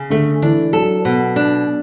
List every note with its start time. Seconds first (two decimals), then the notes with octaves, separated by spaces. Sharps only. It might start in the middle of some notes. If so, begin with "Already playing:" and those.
Already playing: C#3
0.10 D3 A3
0.42 E3 D4
0.73 F#3 A4
1.05 B2
1.36 D4